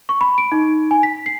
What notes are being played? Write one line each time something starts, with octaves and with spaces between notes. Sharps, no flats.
C#6
B5
D7
D#4
G#5
B6
C7